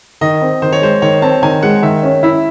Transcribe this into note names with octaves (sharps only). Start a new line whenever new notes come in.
D#3 D#5
C4
D#3 C5
C#5
G#3 C5
D#3 C#5
C4 A5
D#3 G#5
G#3 F#5
D#3 E5
C#4
E4 E5